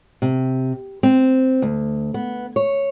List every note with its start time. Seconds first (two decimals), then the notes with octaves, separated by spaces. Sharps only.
0.22 C3
1.03 C4
1.62 D2
2.14 B3
2.56 C#5